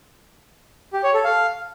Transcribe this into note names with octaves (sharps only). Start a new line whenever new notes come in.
G4
C#5
A4
F5